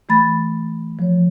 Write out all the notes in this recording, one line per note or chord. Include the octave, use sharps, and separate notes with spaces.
E3 A3 B5 A6
F3 C#5